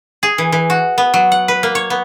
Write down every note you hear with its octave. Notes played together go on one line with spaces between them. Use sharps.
G#4
E3
E3
F#4
B3
F#3
F#5
B4
A#3
C#5
B3